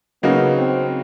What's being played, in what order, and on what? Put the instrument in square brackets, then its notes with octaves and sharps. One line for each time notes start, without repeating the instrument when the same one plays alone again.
[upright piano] C#3 F#3 A#3 D#4 [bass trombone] B3
[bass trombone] C4